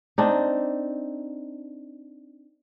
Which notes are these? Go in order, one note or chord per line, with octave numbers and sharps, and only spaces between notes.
C4 D4 D#4